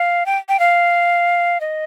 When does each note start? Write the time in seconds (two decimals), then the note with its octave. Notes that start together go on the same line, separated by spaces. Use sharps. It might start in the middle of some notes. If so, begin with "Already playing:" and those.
Already playing: F5
0.26 G5
0.49 G5
0.60 F5
1.61 D#5